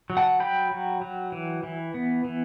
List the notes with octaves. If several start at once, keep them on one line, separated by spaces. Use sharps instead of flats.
F#3
F#5 A5
F#3 G5 B5
F#3
F#3
E3
E3
B3
E3